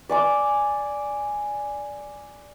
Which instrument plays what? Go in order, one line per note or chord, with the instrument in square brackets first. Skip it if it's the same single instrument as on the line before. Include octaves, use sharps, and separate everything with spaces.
[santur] D5 G#5 D6